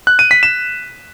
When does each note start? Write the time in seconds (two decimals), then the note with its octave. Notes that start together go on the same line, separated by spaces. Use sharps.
0.07 F#6
0.19 D#7
0.31 B6
0.43 E7